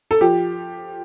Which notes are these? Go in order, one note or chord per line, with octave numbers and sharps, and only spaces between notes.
A4
F3 G4